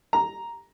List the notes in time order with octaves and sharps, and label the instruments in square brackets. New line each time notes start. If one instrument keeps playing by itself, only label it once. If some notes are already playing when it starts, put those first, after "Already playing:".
[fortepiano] A#5